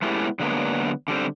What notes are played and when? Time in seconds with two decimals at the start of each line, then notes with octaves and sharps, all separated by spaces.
0.02 G#3 A3 B3 C#4 E4 G4
0.40 D3 F#3 G#3 A#3 B3 D4
1.08 D3 G3 C4